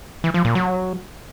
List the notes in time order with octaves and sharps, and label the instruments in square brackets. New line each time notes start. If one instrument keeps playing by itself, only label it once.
[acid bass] E3
F3
A#2
F#3